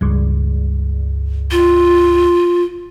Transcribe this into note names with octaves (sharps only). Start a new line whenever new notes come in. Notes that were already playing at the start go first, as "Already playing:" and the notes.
C#2 G2
F4